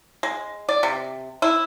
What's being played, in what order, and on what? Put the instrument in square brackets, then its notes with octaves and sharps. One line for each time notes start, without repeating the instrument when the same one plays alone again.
[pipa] G#3
D5
C3
E4